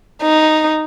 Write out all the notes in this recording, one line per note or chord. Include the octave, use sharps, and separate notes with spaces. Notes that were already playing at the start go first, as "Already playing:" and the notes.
D#4